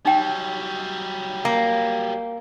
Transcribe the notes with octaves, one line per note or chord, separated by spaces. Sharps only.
F#3 G3 D#4 G5
A#3